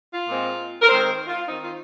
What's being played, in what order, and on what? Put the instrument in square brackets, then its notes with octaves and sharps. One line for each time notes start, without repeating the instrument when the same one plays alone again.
[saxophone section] F4
A#2 G#3 C4
A#4
D#3 G#3 C4 C5
F4
D#3 C4 D#4
F4